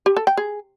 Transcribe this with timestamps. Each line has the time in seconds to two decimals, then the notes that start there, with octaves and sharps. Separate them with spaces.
0.06 G4
0.17 A4
0.27 G5
0.37 G#4